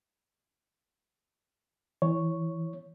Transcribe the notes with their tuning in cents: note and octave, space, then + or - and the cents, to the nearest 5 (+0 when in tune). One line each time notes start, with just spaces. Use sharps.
E3 +0 C#5 +0